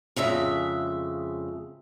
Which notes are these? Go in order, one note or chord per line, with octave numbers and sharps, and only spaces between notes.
F2 C#3 G#3 E5